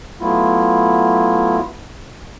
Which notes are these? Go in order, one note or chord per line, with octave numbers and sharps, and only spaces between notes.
F#3 A3 B3 E4 F4